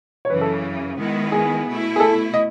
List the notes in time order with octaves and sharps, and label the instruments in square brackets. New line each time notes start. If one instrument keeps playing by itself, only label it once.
[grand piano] C#5
[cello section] F#2 C#3 E3 [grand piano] B4
[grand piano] A4
[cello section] D#3 G#3 B3 E4
[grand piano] G#4
[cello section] B2 A3 E4
[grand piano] G#4
A4
D#5